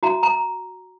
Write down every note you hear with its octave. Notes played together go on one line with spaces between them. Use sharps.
F#4 A#5
A#5